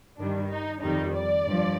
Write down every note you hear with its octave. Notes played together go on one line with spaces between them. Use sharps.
G2 D#3 G3 D4
D#4
F2 D#3 G3 D#4
D5
G2 F3